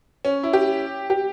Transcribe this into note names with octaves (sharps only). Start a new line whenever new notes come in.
C#4
E4
G4
G4